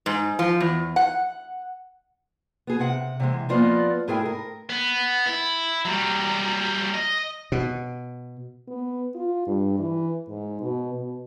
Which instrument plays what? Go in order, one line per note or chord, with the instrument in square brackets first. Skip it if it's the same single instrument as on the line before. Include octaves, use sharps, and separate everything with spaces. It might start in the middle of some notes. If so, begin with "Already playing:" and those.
[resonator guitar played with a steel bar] G#2
F3
E2
F#5
[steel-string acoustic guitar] B3 G#4
C3 F#5
C3 E3 G#3
F3 A#3 B3 F4 D5 D#5
G#2 A3 E4 G#4 A#4 G5
A#4
[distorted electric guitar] B3
E4
F#3 G3
D#5
[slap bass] B2
[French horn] B3
F4
G2
E3
G#2
B2
B2